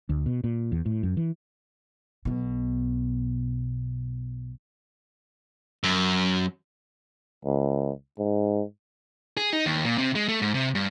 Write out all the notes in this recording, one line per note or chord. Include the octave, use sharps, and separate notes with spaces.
D2
B2
A#2
E2
A2
F#2
E3
B1 B2
F#2
C#2
G#2
G#4
D#4
D#2
A#2
C3
G#3
A3
G#2
C3
G2